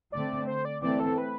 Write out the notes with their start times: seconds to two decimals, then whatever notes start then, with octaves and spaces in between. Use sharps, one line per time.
0.12 D3 A3 C4 D5
0.47 C5
0.65 D5
0.82 E3 A3 C4 D5
1.00 A4
1.18 B4